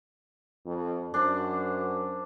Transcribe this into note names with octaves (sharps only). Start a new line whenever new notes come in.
F2
F#2 D4 C5 D5